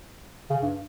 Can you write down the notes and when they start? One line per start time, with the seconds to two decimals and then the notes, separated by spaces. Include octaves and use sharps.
0.50 C#3
0.63 G2